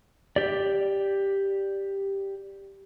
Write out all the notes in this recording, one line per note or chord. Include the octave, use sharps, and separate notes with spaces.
G4 D5